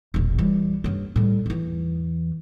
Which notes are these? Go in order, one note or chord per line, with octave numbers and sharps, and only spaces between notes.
E1 A#1
E3 G3
G2 C#4
A2 G3
E2 E3